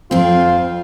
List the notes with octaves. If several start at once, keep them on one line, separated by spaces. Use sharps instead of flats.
F2 C4 F4